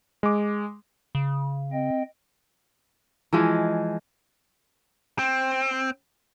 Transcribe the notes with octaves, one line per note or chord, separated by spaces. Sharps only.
G#3 D6
C#3
C4 D#5 G5
E3 F3 G#3
C4